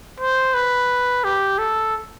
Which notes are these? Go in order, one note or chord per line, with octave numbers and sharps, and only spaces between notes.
C5
B4
G4
A4